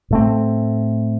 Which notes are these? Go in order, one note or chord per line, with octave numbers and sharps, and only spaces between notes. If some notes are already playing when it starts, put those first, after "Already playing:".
A2 A3 C4